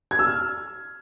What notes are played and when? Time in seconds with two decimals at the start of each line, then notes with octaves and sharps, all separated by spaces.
0.11 G#6
0.19 E6
0.27 F6